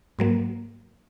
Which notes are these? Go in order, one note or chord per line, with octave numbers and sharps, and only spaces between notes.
G#2 F#3 A#3